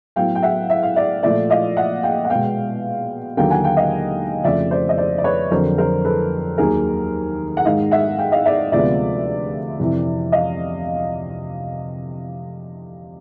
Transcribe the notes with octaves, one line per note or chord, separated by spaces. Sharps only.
A2 F#3 B3 F5 G5
G5
E5 F#5
E5
F5
D5 E5
A#2 F3 A3 D5 E5
D#5 F5
E5 F#5
F5 G5
F#5
B2 G#3 B3 F5 G5
D#2 D3 F#3 A#3 F5 G5
F#5 G#5
F5 G5
D#5 F5
F2 C#3 F3 A3 D5 E5
C5 D5
D#5
C5 D5
D5
B4 C#5
F2 D3 F#3 A#4 C5
A#4 C5
A4 B4
D#2 D#3 F#3 A#3 G#4 A#4
F#5
G#2 D#3 G#3 D#5 F5
E5 F#5
F5 G5
D#5 F5
D5 E5
D2 C3 F3 G#3 B3 D5 E5
F2 C3 E3
D#5 F5